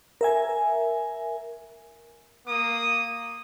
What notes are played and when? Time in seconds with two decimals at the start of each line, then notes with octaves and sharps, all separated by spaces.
0.21 A#4 E5 G#5
2.46 A#3 D#6